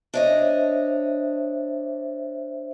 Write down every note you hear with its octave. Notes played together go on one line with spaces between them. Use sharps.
D4 C5 C#5 D#5 E5